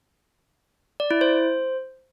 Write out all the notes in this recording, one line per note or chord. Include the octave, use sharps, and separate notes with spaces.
D5
E4
C5